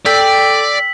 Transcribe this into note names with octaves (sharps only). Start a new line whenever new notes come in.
A4 D5 G5 E6 B6